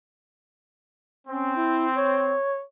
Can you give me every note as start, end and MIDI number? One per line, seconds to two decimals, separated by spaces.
1.28 2.34 60
1.28 1.56 61
1.56 1.87 64
1.97 2.62 73